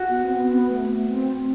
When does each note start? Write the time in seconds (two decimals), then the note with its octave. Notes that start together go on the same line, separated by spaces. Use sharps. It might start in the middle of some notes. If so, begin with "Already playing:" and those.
Already playing: F#4
0.09 B3
0.24 C4
0.34 B3
0.71 A3
1.09 C4